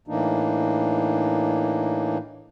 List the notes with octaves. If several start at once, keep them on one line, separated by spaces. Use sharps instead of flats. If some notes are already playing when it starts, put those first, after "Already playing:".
A2 E3 A#3 D4 D#4